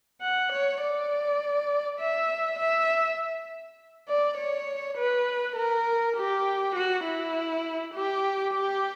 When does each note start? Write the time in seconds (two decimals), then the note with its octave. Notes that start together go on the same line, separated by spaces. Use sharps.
0.22 F#5
0.52 C#5
0.81 D5
2.00 E5
2.59 E5
4.08 D5
4.37 C#5
4.98 B4
5.56 A#4
6.16 G4
6.76 F#4
7.04 E4
7.94 G4
8.54 G4